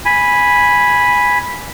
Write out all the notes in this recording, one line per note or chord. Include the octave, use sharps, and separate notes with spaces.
G#5 B5